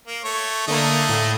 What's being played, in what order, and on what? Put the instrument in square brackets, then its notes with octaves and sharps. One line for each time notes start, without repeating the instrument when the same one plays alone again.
[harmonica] A#3
A3 C#5
[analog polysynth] D3 A#3 [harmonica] A3 D#5
[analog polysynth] A2